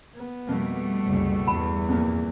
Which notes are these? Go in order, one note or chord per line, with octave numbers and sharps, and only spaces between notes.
B3
F2 B2 G3 A3 A#3
F#1 C2
E2 G2 B5
F2 A#2 A#3